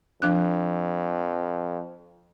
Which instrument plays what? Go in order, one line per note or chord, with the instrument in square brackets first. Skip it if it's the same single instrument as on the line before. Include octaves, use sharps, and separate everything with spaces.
[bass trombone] F2 [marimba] F3 D4 F#6